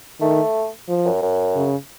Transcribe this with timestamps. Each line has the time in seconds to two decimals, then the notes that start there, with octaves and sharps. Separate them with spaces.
0.20 D#3 A3
0.89 F3
1.05 F#2
1.22 F#2
1.56 C#3